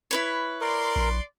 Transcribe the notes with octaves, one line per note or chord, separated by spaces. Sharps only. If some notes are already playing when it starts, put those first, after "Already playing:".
E4 B4 C#5
A#4 D5 C6
A#1